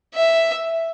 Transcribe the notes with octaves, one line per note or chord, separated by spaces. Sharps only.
E5